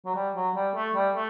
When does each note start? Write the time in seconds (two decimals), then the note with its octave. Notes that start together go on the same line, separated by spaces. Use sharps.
0.06 F#3
0.15 G3
0.36 F#3
0.55 G3
0.74 A3
0.95 G3
1.15 A3